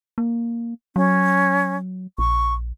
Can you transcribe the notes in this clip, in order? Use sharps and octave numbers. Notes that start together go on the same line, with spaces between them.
A#3
F#3 C#4
A#1 C#6